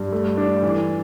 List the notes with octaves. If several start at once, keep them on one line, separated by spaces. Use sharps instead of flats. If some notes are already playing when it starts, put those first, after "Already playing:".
Already playing: G2
A3
D4
E3